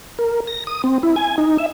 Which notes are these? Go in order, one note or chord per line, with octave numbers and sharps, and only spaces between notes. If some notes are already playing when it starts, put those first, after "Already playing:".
A#4
A#6
D#6
C4
E4
G#5
D#4
E5